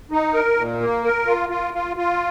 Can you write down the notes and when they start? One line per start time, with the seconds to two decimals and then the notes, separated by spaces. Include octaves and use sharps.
0.11 D#4
0.34 A#4
0.57 A#2
0.80 A#3
1.04 A#4
1.27 F4
1.49 F4
1.74 F4
1.97 F4